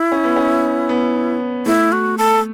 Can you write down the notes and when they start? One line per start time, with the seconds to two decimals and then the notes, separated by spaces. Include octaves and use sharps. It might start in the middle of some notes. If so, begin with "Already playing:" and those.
Already playing: E4
0.12 C#4
0.24 B3
0.36 C#4
0.89 B3
1.66 A3 E4
1.92 F#4
2.18 A4